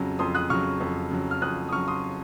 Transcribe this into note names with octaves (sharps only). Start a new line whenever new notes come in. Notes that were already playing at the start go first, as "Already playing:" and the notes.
Already playing: F2 C#3 F#3
F2 C6 D#6
D#6 F#6
C#3 F#3 C#6 F6
F2
C#3 F#3
F6
F2 D#6 F#6
D#6
C#3 F#3 C#6 F6
C6 D#6